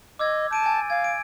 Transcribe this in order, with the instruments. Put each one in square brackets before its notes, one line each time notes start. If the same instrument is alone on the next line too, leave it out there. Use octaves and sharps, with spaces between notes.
[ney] D#5 [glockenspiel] D6 E6 G#6
[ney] A5 [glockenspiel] G6 D7 D#7
[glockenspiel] G#5 A6
[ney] F5 [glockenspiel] G#6
[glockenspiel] D7